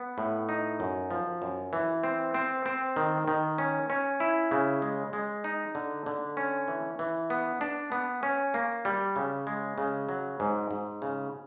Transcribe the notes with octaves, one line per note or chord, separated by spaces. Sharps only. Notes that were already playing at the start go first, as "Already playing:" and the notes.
Already playing: B3
A2
D#4
F#2
F3
F#2
E3
C4
C4
C4
D#3
D#3
C#4
C#4
E4
C#3
G#3
G#3
D#4
D3
D3
C#4
E3
E3
B3
D4
B3
C#4
A#3
G3
C#3
G#3
C#3
F#3
G#2
G#2
C#3